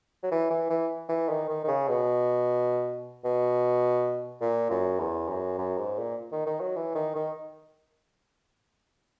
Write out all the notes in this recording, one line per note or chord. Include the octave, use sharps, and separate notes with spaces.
F#3
E3
E3
E3
E3
D#3
D#3
D#3
C#3
B2
B2
A#2
F#2
E2
F#2
F#2
G#2
A#2
D#3
D#3
F#3
E3
D#3
D#3